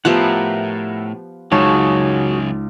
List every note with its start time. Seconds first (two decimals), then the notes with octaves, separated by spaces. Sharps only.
0.05 A2 F3 B3 G4 A#4 E5 F#5
1.52 C#2 F#2 C#3 D#4 F#4 G#4 C#5 A5